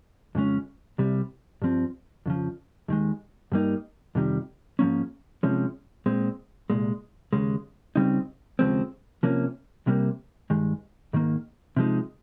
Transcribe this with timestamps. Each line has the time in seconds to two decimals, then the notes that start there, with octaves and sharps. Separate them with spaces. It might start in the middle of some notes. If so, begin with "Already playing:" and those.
0.35 F2 C#3 G#3 C#4
0.98 C2 C3 G3
1.62 G2 F3 C4
2.26 F2 C#3 F3
2.88 D#2 D#3 G#3
3.52 G2 G3 A#3 D#4
4.15 F2 C3 D#3 G3
4.79 G#2 F3 A#3 C#4
5.43 C3 F3 G#3 C#4
6.06 A#2 G#3 C4
6.70 C2 A#2 G#3
7.33 D#2 C#3 G#3
7.96 C#2 C#3 G3 C4 D#4
8.59 D#2 C#3 F3 G#3 C4
9.23 C3 F3 A#3 C#4
9.86 C2 C3 G3 A#3
10.50 G2 D#3 G#3
11.13 G#2 D#3 A#3
11.77 C3 F3 G#3 D#4